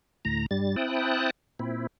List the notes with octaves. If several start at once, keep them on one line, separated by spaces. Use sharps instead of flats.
D2 A2 A#5
G2 G3 A6
C4 E4 G5 A5 D#6 F#6
A#2 C4 E4